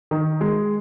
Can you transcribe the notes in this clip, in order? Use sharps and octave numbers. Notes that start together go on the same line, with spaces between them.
D#3
G#3